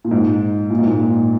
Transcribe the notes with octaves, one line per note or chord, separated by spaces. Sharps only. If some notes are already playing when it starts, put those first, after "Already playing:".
A#2
G#2
A#2
G#2
A#2